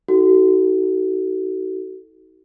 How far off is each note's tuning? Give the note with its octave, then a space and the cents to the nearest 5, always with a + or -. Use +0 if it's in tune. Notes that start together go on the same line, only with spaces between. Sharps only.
D#4 +45 F#4 +30 A4 +0